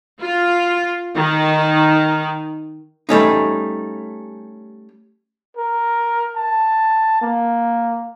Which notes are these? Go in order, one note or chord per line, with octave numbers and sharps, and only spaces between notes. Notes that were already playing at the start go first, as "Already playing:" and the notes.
F4
D#3
G3 A3 C#4 D#4
A#4
A5
A#3